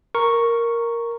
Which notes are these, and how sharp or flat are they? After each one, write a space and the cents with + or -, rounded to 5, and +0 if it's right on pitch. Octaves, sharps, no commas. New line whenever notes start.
A#4 +0 C#6 +0